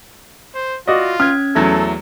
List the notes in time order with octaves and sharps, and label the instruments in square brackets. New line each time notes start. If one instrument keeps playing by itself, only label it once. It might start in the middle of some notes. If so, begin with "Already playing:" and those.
[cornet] C5
[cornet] F4 [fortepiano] F#4 D5 D#5
[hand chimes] C#4 G#6 [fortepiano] F6
[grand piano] E2 F#3 A3 [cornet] A4